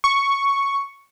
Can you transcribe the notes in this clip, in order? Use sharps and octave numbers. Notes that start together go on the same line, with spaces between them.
C#6